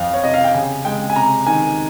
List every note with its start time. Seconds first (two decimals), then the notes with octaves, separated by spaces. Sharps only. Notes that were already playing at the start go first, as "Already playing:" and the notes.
Already playing: F2 F5
0.14 C#5
0.24 C3 D#5
0.34 F5
0.44 G5
0.54 C#3 G#5
0.85 G#3 G5
1.10 G#5
1.16 C3 A#5
1.46 D#3 G#5